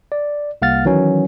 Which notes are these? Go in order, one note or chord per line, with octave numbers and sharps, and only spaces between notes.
D5
C2 A#3 F5 F#5 F6 A6
D#3 E3 F#3 C#4